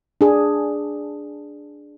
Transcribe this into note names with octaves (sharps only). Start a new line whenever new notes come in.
D4 G#4